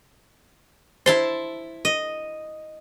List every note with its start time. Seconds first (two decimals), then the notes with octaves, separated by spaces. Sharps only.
1.06 E4 C5 A5 C6
1.85 D#5